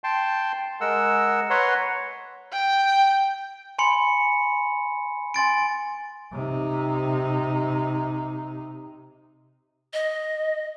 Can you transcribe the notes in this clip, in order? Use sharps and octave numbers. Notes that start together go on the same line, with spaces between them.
G5 A5 C6
G#3 A#4 F#5 E6
B4 C#5 F#5 A#5 C6
G5
G#5 B5 C6 C#7
G#5 C6 A6 D7
C3 D#4
D#5